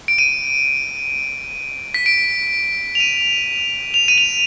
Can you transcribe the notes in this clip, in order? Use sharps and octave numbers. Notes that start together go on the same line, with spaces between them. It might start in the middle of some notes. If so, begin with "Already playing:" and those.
D7
D#7
B6
D7
F7
D#7
F7
D#7
F7